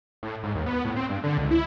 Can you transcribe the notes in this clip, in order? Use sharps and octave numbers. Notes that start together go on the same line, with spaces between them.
A2
G#2
D#2
B3
A2
C4
G2
D3
C#2
E4